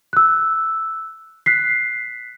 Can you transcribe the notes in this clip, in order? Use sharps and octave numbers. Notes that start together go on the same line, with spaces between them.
E6 F#6
F#6 B6 C7